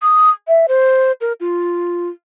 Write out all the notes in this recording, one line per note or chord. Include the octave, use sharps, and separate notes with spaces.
D#6
E5
C5
A#4
F4